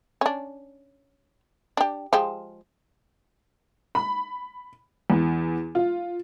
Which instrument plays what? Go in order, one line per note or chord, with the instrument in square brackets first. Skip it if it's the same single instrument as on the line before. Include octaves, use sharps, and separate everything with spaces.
[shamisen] C#4 D4
D4 G4
F3 G#3 G4
[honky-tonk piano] B5
E2
F4